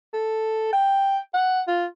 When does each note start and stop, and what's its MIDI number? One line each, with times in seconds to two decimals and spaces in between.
0.13 0.71 69
0.72 1.18 79
1.34 1.61 78
1.67 1.85 65